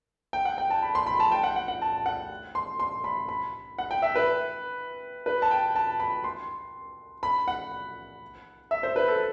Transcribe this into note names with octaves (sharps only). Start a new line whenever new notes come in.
G5
F#5
G5
A5
B5
C6
B5
A5
G5
F#5
F#5
F#5
A5
F#5
C6
C6
B5
B5
F#5
G5
E5
B4
B4
A5
G5
A5
B5
C6
B5
F#5
E5
C5
B4
A4